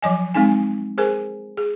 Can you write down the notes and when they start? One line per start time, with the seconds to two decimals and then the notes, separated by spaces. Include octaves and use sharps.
0.02 F3 F#3 D#5 G#5
0.34 G#3 C4 D#4 G#5
0.98 G#4 A#4 C5 G#5
1.57 G#4